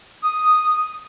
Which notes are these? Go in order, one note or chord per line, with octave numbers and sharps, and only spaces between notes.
D#6